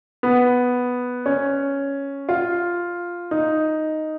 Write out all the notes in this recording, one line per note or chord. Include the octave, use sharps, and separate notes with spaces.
B3
C#4
F4
D#4